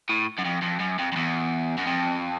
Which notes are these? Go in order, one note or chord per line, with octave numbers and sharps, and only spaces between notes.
A2
F#2
F2
F2
F#2
F2
F2
E2
F#2
F2